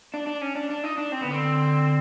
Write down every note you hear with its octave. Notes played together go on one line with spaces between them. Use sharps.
D4
D4
C#4
D4
D4
D#4
D4
C4
D3 B3
C4